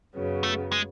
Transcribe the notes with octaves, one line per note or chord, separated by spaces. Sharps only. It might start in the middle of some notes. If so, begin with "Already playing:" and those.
F#2 C#3 F#3 B3
A3
G#3